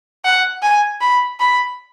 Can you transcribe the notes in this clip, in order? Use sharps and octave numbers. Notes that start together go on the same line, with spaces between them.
F#5
G#5
B5
B5